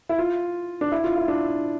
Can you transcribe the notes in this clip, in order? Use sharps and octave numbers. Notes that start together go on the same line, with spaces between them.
E4
F4
D4
E4
F4
E4
D4